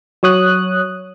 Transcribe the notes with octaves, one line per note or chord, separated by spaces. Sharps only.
F#3 C#5 D#6 F#6